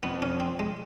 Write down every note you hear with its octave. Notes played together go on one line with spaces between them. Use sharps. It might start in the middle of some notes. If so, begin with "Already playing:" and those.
F2 B3
C#4
C4
G#3